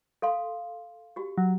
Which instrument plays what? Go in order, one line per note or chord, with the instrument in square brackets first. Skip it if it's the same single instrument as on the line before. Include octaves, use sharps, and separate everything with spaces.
[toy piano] A4 F5 C6
F#4 G4
[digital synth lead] F#3